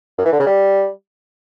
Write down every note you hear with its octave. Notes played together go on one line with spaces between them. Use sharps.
F#2
E3
D3
C#3
G3